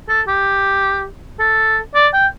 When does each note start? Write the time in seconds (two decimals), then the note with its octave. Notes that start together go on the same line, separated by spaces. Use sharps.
0.08 A4
0.27 G4
1.39 A4
1.94 D5
2.13 G5